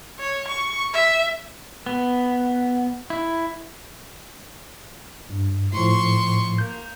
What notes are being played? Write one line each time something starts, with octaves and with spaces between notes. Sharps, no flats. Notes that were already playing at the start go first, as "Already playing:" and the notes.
C#5
C#6
E5
B3
E4
G2
A2 F3 C6 C#6
A#3 G6